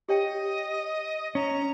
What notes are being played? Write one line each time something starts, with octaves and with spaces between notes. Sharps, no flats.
G4 C#5 D#5 G5
C#4 A#5